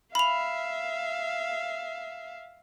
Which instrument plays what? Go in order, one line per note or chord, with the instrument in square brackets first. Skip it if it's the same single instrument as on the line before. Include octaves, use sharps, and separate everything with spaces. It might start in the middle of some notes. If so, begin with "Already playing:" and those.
[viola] E5 F5 [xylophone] B5 F7